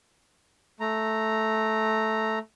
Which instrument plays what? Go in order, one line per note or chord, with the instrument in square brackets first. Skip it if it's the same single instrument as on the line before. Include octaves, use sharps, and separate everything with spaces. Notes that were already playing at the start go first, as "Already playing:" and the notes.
[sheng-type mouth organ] A3 A#5